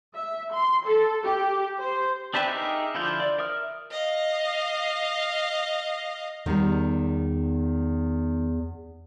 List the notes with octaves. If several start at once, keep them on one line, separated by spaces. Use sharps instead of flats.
E5
C6
A4
G4
C5
C4 D4 G4 B4 E5
D#4 G4 G#4 A#4 E5
D3 F3 E4 F4 G6
D5
A#4 E5 D#6 F6
D#5 F5
E2 D#3 G3